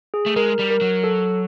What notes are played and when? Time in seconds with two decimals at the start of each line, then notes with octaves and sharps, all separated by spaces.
0.14 G#4
0.26 A3
0.36 G#3 A#4
0.59 G3
0.70 A#4
0.81 F#3
1.04 A4